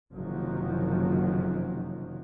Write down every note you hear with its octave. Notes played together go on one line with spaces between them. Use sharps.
F#1 F#2 C3 D#3 F3 F#3